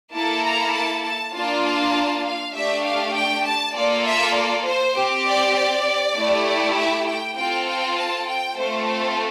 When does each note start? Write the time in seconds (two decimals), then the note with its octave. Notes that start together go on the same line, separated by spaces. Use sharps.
0.13 A#3 E4 A4 A5
0.44 A#5
0.75 A5
1.04 A5
1.35 A#3 D4 F4 A5
1.65 A5
2.25 F5
2.55 A3 D4 G4 E5
2.85 F5
3.15 G5
3.46 A5
3.76 A#3 F4 A4 D5
4.06 E5
4.35 D5
4.67 C5
4.96 C4 G4
5.26 D5
5.56 D5
6.17 A3 E4 G4
6.46 D5
6.78 E5
7.07 G5
7.37 C4 F4 A4 G5
7.67 G5
7.97 A5
8.28 G5
8.58 A3 C4 F4 A4 C5
8.88 C5